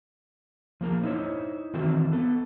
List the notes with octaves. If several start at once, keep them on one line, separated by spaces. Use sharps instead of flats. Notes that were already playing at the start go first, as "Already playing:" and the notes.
F3 A#3 A#4 A#5
D#4 E4 C5 C#5
D#3 E3 C4 F#4 A4 A#4
B3 A4